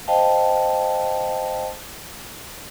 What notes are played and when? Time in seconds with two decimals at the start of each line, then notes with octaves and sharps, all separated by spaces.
0.08 C5 D#5 F5 G5 A5